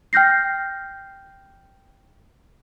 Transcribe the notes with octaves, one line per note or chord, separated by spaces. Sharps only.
G5 F6 G6 A#6 C7